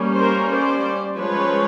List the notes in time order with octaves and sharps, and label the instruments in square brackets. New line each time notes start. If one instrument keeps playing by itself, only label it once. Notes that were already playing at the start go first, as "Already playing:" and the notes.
Already playing: [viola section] G3 A#3 C#4
A#4 C5
C5 D5
F3 G#3 C#4 B4 C#5